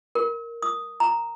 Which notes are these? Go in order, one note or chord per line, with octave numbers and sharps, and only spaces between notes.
A#4
D#6
A#5